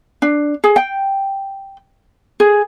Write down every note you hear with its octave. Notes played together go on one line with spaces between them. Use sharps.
D4
G#4
G5
G#4